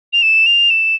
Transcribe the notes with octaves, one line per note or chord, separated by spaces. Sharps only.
F7
E7
F7
E7